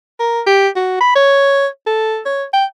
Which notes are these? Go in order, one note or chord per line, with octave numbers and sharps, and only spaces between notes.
A#4
G4
F#4
B5
C#5
A4
C#5
G5